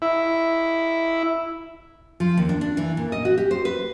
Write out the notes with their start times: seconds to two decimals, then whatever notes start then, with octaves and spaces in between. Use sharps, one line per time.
0.02 E4
2.20 F3
2.37 D#2
2.49 D4
2.61 D4
2.77 E3
2.97 A#2
3.12 D#5
3.25 F#4
3.38 G4
3.51 C5
3.65 B4